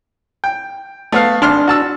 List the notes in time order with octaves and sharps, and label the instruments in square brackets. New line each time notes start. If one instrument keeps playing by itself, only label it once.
[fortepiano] G5
A3 B3 F5
[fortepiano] G#1 C6 F6 [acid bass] D4
[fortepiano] F#4 A5 E6